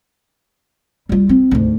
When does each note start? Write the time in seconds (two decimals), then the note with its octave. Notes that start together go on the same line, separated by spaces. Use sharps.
1.09 G3 F4
1.29 C4
1.51 D2 G#2